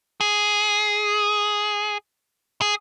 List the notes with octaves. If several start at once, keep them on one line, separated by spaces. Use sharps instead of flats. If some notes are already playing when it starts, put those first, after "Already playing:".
G#4
G#4